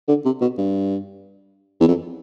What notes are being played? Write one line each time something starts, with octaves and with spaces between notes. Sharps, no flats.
D3
C3
B2
G2
E2
F2